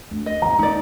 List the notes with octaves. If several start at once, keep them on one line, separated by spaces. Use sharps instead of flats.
D2
D#5
E2 E4 A#5
A#3 D#4 D5